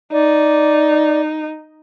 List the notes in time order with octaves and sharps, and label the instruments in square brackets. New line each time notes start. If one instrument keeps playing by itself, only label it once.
[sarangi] D#4 [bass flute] D5